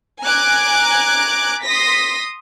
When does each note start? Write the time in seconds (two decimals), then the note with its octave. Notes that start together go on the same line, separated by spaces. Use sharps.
0.22 G#5 A#5 D6 F#6 G#6
1.62 C6 D#6 A#6 B6